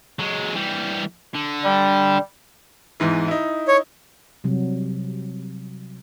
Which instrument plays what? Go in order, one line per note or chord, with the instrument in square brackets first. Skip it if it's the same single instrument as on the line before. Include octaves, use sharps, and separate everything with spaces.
[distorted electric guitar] F#3 G#3
E3 G3
D3
[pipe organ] G3
[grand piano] E2 G#2 E3
D#4 E4
[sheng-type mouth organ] C#5
[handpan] C3 F#3 G3